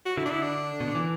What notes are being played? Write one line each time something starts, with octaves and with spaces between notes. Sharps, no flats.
F#4
D3 E4
D4
E4
D4
B2
D3
E3